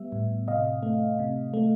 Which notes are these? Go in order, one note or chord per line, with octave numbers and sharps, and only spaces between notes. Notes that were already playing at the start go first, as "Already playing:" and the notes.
Already playing: G3 B3 E5
A2
C3 D#5 F5
A3
C3
A3